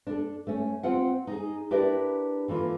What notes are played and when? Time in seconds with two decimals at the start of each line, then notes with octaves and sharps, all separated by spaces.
0.07 D4 A4
0.47 A3 C#4
0.83 C4 F4 F#5
1.27 D#4 G#4
1.71 D4 E4 G4 A#4 B4 D5
2.48 D3 E3 A#3 F4